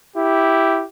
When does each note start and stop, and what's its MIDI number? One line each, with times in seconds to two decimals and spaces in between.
0.16 0.83 64
0.16 0.87 67